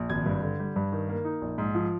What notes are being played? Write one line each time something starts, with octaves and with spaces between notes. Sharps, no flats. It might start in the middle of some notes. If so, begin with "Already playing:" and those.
Already playing: A#1
G#1 G#6
G2
D3
G3
G2
D#3
A#3
D#4
A#1
G#2
F3